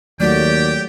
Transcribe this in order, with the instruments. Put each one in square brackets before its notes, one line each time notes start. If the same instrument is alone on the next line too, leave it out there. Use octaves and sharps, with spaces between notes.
[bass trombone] D#2 [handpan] F#3 A3 F#4 [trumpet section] G4 G5 [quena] D5